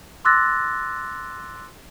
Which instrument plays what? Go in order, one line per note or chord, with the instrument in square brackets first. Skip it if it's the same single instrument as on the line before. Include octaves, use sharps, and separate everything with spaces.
[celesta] C6 D6 E6 F#6 A6 A#6